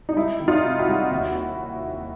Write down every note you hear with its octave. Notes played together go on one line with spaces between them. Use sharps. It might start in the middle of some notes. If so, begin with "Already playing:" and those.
D#4
G3 E4
D#3
D#4 F4
C3
E4 F#4
G3
D#2